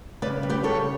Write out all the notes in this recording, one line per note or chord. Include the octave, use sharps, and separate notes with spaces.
C#3 B4 D5
G3
G4 B4
C#3 A4 C#5